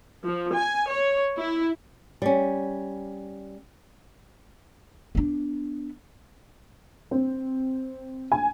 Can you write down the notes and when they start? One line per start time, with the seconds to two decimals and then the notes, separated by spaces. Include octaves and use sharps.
0.23 F3
0.54 G#5
0.89 C#5
1.36 E4
2.22 G3 C#4
5.15 B3 D4
7.11 C4
8.32 G#5